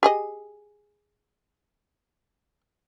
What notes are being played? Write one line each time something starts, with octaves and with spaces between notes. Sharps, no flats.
G4 G#4 D#5